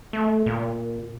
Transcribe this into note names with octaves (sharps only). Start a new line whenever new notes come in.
A3
A#2